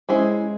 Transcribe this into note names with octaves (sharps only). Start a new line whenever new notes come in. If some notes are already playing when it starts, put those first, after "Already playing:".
G#3 C#4 E4 G#4 C5